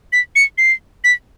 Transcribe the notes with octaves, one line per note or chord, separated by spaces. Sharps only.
B6
C#7
C7
B6